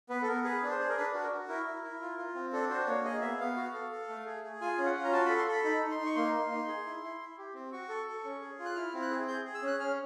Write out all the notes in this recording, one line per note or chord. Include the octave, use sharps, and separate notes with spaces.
B3 B4
A4
B3 A#4
G#4 B4
D4
C5
G#4
A#4
D4 B4
F#4
A#4
F#4
E4 A#4
E4
E4
F4
F4
C4
D4 A4
F#4 C5
A#3 C#5
G#4 D#5
B3 E5
B3 F5
F#4
A4
A4
A3
G#4
G#4
F4 G#5
C#4
F#5
F4
A#5
F#4 A5
A4 B5
C6
A4 B5
D#4 B5
D#4
C6
D#4
C#6
A#3 C6
A#3
D#4
G#4
E4
E4
E4
G4
C4
F#4 C#6
A4
A4
C#4
G#4
F4
F#6
E4 F6
C4
F#6
G#4
G#4 G6
G#4
E6
C#4 F#6
C#4 F6